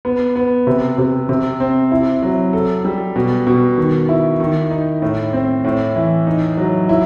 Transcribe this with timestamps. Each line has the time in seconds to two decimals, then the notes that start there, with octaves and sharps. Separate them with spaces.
0.05 B3
0.36 B3
0.67 C3
0.98 C3
1.29 C3
1.60 C4
1.92 E4
2.22 F#3
2.53 A4
2.85 G3
3.16 B2
3.47 B2
3.78 D#3
4.09 E4
4.40 D#3
4.71 D#4
5.02 A2
5.33 C4
5.64 A2
5.95 E3
6.27 D#4
6.57 F#3
6.89 E4